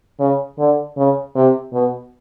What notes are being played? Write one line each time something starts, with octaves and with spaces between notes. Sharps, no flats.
C#3
D3
C#3
C3
B2